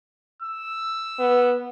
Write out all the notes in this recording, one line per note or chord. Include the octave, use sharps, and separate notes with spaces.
E6
B3